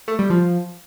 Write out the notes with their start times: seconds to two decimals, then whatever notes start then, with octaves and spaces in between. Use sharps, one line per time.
0.08 A3
0.19 G3
0.30 F3